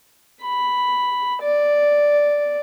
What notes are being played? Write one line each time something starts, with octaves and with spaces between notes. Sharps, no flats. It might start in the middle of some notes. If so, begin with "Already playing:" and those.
B5
D5